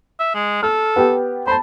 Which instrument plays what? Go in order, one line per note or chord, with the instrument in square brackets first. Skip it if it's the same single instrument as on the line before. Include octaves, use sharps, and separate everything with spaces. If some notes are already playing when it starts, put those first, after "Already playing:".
[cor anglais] E5
G#3
[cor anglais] A4 [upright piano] F6
[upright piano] B3 G4 G5
[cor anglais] C5 [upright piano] A5 B5